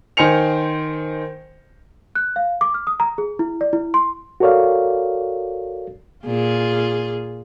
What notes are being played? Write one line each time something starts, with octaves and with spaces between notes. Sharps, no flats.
D#3 C5 G#5 C#7 F7
F#6
F5
D6
F6
D#6
A#5
G#4
E4
D5
E4
C6
F#4 A4 A#4 C#5 D5 F5
A#2 F4 G#4